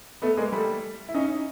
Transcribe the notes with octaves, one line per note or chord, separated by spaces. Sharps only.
A3 B3
G#3 A#3
G3 A3
E4
C#4 D#4